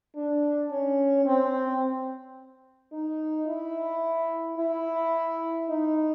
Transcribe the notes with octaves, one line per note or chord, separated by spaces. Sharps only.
D4
C#4
C4
D#4
E4
E4
D#4